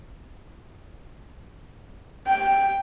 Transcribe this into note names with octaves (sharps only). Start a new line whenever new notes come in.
G5